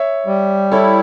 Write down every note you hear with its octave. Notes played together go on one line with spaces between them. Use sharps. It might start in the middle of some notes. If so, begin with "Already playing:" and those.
Already playing: C#5 E5
G3
E4 A4 C#5